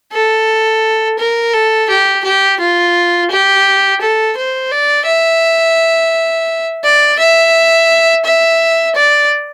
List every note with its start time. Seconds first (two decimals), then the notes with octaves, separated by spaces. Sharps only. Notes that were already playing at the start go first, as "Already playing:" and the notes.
0.12 A4
1.18 A#4
1.53 A4
1.89 G4
2.24 G4
2.59 F4
3.30 G4
4.01 A4
4.37 C5
4.71 D5
5.06 E5
6.84 D5
7.19 E5
8.25 E5
8.95 D5